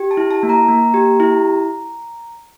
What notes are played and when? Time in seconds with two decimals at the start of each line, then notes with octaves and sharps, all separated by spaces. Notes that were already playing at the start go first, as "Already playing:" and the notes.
Already playing: G4
0.11 A5
0.17 E4
0.31 A5
0.43 A#3
0.49 A#5
0.68 A#3
0.94 G4
1.20 E4